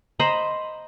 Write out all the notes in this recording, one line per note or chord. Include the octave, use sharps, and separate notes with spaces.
C5 D#5 A#5 B5